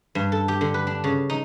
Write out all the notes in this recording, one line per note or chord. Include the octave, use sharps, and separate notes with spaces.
G2
A4
G4
D3
B4
D4
C#3
D#4